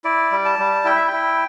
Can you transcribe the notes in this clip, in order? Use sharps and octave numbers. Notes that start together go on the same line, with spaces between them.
E4 D5
G3
A5
G3
E4 G5
E5
E4 G5